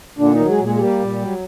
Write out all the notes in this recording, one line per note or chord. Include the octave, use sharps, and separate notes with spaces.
A#2 D3 D4
D#3 D#4
F#3
G#3 G#4
A#2
G#3 G#4
G#4
G3 A#3 G4
A#2
F#3